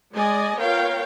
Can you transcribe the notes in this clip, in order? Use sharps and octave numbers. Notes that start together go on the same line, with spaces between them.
G#3 D5 D#5 G#5
B3 F4 A#4 C#5 F5 G5